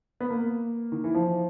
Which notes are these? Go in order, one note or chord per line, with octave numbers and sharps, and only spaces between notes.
B3
A#3
D#3
E3
F3